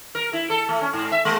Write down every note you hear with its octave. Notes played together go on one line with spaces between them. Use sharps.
A#4
E4
A4
A3
C#4
G#2
E5
G#3